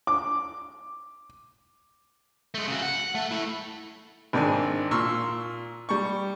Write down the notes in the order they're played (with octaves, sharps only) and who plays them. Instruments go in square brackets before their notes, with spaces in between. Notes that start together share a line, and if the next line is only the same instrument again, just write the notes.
[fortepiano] D6
[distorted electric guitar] G#3 A3
C#3 F#4
F#5
A3
A3 E4
[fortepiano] G#1 C4 D4 A#4 G#5
A#2 C6 C#6 E6 F6
G3 C#6